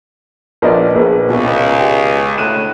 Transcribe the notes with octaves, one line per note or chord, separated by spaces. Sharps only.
A#1 F3 B4 D5 D#5
A#1 G#4 B4 C5
C#2 B2
G4
D2 A2 F#6 D#7 E7